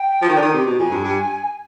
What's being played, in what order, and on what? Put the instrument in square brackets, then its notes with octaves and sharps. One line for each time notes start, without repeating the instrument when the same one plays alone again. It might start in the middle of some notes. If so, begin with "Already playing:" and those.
Already playing: [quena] G5
[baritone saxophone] F3
D#3
D3
D#3
C3
B2
[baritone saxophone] F2 [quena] G#5
[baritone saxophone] G2
G2